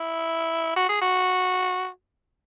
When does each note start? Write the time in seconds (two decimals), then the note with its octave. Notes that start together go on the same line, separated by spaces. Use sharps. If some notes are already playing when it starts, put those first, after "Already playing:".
Already playing: E4
0.76 F#4
0.89 G#4
1.01 F#4